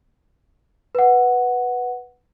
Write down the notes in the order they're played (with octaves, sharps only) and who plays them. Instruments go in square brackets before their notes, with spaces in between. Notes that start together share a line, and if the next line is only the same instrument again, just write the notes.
[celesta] B4 F#5